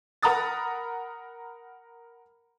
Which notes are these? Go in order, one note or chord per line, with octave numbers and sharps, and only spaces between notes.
A#4 F#5 A#5 B5 D#6 A6